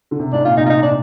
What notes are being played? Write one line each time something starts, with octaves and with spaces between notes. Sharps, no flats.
D3
C3
G#2 D4
A#2 F4
C3 D#4
F4
D#4
D4